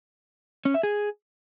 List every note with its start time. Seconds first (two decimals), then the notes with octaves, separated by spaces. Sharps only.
0.65 C#4
0.74 E5
0.83 G#4